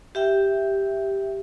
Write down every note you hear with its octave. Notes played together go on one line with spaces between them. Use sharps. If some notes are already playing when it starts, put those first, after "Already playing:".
G4 E5 G5